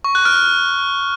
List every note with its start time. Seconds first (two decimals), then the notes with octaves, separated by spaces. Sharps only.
0.04 C#6
0.15 F#6
0.25 F6
0.36 F6